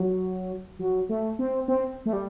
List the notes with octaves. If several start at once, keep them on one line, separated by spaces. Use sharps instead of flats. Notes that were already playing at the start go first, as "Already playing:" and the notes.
Already playing: F#3
F#3
A3
C4
C4
A3
G3